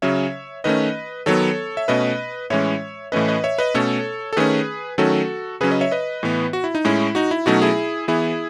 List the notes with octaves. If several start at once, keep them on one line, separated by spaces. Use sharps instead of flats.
C#3 F#3 C#4 C#5 E5
D#3 A3 C#4 B4 D#5
D#3 F#3 B3 A4 C#5
E5
B2 A3 C#4 B4 D#5
A2 E3 G#3 C#4 C#5 E5
A2 E3 A3 C#4 B4 D#5
B4 D#5
C#5 E5
B4 D#5
B2 A3 C#4 A4 C#5
A4
D#3 A3 C#4 G#4 B4
D#3 F#3 A3 C#4 F#4 A4
C#3 F#3 C#4 G#4 B4
B4 D#5
C#5 E5
B4 D#5
A2 E3 B3
F#4
E4
D#4
A2 G#3 C#4 E4
D#4 F#4
E4
B2 F#3 A3 C#4 D#4 F#4
E4 G#4
E3 B3 E4 G#4